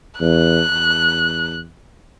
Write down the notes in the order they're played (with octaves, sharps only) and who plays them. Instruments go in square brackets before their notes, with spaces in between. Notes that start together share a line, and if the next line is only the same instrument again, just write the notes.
[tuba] E2 [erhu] F#6
[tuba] E2